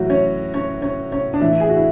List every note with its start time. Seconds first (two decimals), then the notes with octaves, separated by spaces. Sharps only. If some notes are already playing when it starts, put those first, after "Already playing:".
Already playing: A2 E3 F#3 F#4
0.10 C#4 C#5
0.54 C#4 C#5
0.82 C#4 C#5
1.12 C#4 C#5
1.34 D4
1.41 A2 E3 E4
1.60 G#4
1.69 F#4
1.76 E4